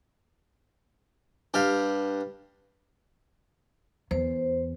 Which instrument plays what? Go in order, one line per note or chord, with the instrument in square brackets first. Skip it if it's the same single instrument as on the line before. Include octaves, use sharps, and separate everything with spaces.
[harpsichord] G2 G4 F5
[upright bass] E2 [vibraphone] C5